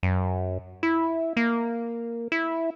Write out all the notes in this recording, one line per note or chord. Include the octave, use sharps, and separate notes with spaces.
F#2
E4
A#3
E4